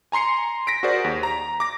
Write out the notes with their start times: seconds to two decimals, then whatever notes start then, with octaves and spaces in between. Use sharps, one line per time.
0.12 G#5 A#5 C6 C7 C#7
0.67 A#6 B6 D7
0.83 F#4 G#4 A#4 C5 D5
1.04 D#2
1.23 A#5
1.60 D6 A#6